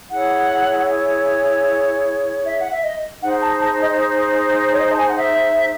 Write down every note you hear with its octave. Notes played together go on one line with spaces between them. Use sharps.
E4 G#4 C#5 F#5
E5
F#5
E5
D#5
D#4 G#4 C5 F#5
A5
A5
D#5
C#5
D#5
A5
G#5
F#5
E5